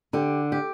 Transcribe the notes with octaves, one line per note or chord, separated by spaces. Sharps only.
D3 G4
G4